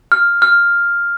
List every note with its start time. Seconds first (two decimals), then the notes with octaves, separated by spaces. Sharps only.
0.12 F6
0.42 F6